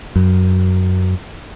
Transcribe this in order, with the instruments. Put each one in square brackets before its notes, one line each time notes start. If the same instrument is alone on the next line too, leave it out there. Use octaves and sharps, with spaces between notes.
[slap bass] F#2